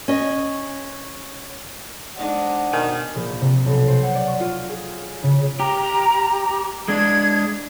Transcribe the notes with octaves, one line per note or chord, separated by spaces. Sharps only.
C#4 D#5
G#3 D4 D#4 C5 D5 F#5
B2 D#3 G#5
A#1
C3
B1
C5
F#5
D5
C#6
F4
G#4
C#3
G4 A#5
G#3 D4 G#6